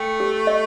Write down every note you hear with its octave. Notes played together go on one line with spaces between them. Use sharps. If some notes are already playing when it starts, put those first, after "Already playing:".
Already playing: A3 G5
G4
D#5